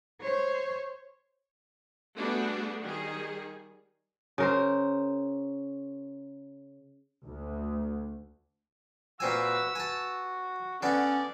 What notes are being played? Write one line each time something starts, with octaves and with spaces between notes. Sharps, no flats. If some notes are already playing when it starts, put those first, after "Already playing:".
C5 C#5
G3 A3 B3 D4 F#4 G#4
D#3 G3 G#4
C#3 A#4 C5
D2
A#2 C4 F#4 B4 G#5 E6
F#4 G#5 A5
D3 B3 C#4 D4 D5